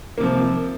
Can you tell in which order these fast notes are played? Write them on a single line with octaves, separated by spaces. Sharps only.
A#3 C3 F3